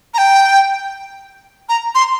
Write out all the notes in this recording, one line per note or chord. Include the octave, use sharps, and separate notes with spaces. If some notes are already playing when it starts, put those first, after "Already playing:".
A#5
G5
A#5
C6